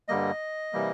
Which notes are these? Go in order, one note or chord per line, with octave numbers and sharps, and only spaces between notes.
G2 D3 G3 A#3 D#5
C3 E3 G3 A#3